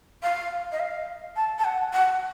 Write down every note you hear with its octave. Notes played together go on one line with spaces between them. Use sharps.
F5
D#5
F5
A5
A5
F#5
F#5